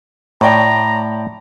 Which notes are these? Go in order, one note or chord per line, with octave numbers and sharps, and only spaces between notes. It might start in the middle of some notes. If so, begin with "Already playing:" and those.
A2 C#5 D5 G5 A#5